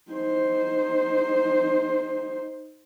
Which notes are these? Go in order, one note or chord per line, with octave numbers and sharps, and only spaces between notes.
D#4 C5